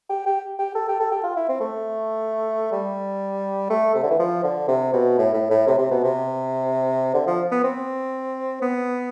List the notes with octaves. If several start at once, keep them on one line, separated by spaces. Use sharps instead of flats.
G4
G4
G4
A4
G4
A4
G4
F4
E4
C4
A3
G3
A3
C3
D3
E3
F3
D3
C3
B2
A2
A2
A2
C3
C3
B2
C3
D3
F3
B3
C4
B3